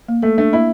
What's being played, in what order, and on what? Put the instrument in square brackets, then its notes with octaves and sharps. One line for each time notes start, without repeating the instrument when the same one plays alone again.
[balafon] A#3
[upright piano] A3 [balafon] A4
[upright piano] A3 [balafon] D4
[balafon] A#3 [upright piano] E4